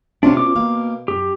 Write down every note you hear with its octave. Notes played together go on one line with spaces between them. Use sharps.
C3 C#4 D4 F4 C#5
B2 D6
A#3 F5
F#2 G4